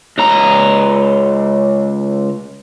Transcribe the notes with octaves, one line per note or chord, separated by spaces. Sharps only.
C#2 A#5